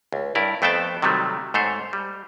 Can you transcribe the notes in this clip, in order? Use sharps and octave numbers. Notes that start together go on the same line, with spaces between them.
C#2
G2 E4 A#4 D5
F2 A3 B3 C5 G5 A5
C3 D#3 F#3 G3 A3
G#2 A3 C5 C#5
G3